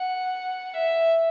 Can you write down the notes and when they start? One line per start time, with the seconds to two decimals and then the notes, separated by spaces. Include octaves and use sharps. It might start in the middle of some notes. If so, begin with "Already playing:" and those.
Already playing: F#5
0.74 E5